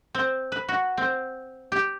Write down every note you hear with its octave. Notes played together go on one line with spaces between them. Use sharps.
C4
B4
F#4
C4
G4